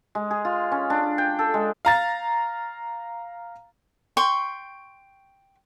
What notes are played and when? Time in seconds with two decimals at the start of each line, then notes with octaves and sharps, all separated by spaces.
0.15 G#3
0.31 G#4
0.45 F4
0.72 C#4
0.90 D4
1.18 G5
1.39 A4
1.54 G#3
1.85 F5 A#5 A6
4.17 G5 C6 C#6